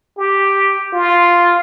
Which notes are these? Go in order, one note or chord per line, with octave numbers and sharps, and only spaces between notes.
G4
F4